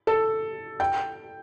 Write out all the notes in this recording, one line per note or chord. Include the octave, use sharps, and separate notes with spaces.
A4
G5